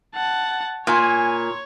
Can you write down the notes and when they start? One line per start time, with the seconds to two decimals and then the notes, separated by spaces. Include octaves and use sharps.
0.14 F#5 A5
0.87 A#2 C#5 G#5